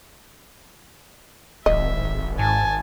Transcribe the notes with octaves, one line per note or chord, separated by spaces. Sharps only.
D1 G#1 D#5 E5
G#2 G#5 A5